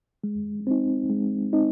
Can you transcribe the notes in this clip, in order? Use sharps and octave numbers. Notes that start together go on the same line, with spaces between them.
G#3
C4 D#4
G#3
C4 D#4